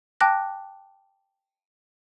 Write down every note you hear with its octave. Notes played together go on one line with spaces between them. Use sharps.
G5 A5 D6 F#6 A#6